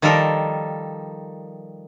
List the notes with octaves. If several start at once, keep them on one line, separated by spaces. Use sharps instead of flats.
D#3 F3 G3 A4 A#4